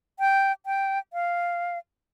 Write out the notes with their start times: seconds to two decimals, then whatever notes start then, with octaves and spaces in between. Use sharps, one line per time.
0.19 G5
0.66 G5
1.13 F5